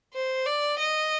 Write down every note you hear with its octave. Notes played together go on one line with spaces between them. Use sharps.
C5
D5
D#5